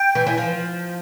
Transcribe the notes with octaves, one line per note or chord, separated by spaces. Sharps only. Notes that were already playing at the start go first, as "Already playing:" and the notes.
Already playing: G5
E3
E3
F3